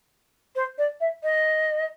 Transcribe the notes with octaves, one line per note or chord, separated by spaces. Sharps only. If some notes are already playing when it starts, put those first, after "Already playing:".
C5
D5
E5
D#5